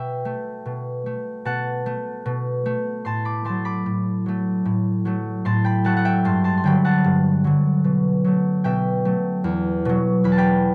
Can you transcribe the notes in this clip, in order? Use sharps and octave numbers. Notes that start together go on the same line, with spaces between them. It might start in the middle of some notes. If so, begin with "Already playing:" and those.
Already playing: B2 E5 G5
A3
B2
A3
B2 F#5 A5
A3
B2
A3
A2 A5 C6
B5 D6
F#3 A3 A5 C6
B5 D6
A2
F#3 A3
A2
F#3 A3
A2 A5 C6
G5 B5
F#3 A3 F#5 A5
F#5
E5 G5
G2 A5 C6
A5 C6
C6
D3 F#3 G5 B5
F#5 A5
G2
D3 F#3
B2
F#3 A3
B2 E5 G5
F#3 A3
E2
B2 F#3
E2 B5
A5
G5 B5